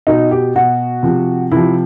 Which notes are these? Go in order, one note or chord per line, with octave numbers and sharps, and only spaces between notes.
B2 D#4
G4
B2 F#4
C3 F3
C3 F3 E4